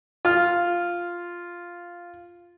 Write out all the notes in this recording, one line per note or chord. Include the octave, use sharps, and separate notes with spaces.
F4 F6